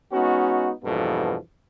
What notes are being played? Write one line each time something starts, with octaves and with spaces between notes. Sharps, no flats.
G#3 B3 C#4 D#4 F#4
E2 G2 B2 F3 A#3 A4